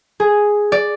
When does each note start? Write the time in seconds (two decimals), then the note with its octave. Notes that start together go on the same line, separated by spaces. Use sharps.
0.20 G#4
0.72 D5